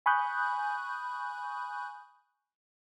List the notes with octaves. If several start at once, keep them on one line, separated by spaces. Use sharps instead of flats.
G#5 B5 C#6 D#6 F#6 G6